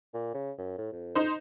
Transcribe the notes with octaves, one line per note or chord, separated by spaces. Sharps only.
A#2
C#3
F#2
A2
F2
D#4 C5